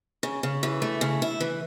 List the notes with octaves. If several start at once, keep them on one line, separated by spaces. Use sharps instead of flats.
C#3
C#3
E3
A3
C#3
E4
E3